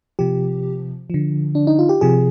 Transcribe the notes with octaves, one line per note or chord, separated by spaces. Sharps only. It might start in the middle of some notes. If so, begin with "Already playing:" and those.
C3 F3 G4
D3 F3
D4
D#4
F4
G4
C3 F3 G#4